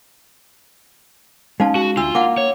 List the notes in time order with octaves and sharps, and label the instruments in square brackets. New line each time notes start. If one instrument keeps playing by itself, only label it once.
[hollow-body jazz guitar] G#3 C#4 [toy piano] D#4 F5 A5
[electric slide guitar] F#4
[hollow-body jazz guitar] D2 [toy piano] D4 E6 [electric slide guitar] F4
[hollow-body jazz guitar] A#3 [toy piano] F5 F#5 D6
[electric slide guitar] C#5